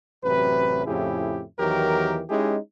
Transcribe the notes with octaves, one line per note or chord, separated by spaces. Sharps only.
A1 F#2 C3 F#3 B4
F2 A2 C#3 E4 G4 G#4
E2 D#3 E3 F#3 G4 A#4
G#3 C#4 D#4 E4 G4 G#4